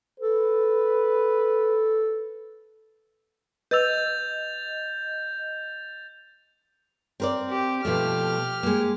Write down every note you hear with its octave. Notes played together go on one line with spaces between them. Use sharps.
A4 B4
B4 D#5 E6 G6 A6 F7
C4 A#4 D5
G4
B2 F3 A3 G4 F6
G#3 A#3